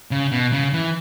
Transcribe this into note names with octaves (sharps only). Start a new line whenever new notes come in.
C#3
B2
C#3
E3